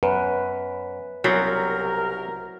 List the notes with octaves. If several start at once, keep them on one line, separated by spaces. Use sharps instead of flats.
F#2 B4
C2 C#3 F#3 B3 C4 A#4